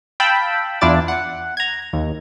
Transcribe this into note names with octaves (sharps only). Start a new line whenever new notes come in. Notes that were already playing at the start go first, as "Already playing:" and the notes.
F5 G5 A5 B5 E6
E2 D4 E4 F4 D5 A6
F#5
A#5 G#6
D#2